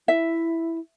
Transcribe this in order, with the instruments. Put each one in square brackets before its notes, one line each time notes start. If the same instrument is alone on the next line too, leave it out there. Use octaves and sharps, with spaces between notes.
[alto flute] E4 [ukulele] E5